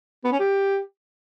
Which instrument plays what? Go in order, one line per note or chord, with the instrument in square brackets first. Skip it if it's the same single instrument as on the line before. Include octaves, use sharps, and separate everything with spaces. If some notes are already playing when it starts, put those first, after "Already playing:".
[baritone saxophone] B3
C#4
G4